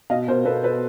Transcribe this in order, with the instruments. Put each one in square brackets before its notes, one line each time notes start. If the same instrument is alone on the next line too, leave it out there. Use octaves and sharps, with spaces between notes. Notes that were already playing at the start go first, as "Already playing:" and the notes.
[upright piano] B2 D#5 F5
B2 A#4 C5
B2 A4 B4
B2 A4 B4